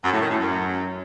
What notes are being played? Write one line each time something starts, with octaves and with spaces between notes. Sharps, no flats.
F#2
A2
D#3
A2
F#2